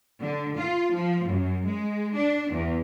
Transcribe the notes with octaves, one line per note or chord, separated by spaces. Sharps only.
D3
F4
F3
F#2
G#3
D4
E2